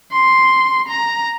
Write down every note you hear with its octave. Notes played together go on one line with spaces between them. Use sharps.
C6
A#5